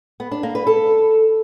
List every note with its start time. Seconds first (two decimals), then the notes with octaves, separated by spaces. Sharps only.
0.20 B3
0.32 D4
0.43 A#3
0.55 B4
0.67 A4